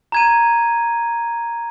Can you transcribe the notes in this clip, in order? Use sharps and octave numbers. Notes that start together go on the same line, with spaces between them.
A#5 G#6 D#7